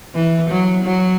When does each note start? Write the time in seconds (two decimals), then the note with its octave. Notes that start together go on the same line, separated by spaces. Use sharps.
0.15 E3
0.50 F#3
0.84 F#3